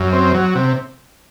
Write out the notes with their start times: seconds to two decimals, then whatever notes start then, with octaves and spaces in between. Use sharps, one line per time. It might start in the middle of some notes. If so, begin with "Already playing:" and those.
Already playing: F#2
0.13 C4
0.34 F#3
0.55 C3